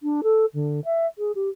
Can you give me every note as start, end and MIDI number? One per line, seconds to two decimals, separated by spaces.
0.03 0.21 62
0.24 0.46 69
0.54 0.81 50
0.85 1.06 76
1.18 1.32 68
1.35 1.49 67